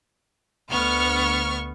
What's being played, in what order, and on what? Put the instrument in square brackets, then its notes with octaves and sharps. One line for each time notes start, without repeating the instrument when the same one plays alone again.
[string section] D2 C#6 F6 [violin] B3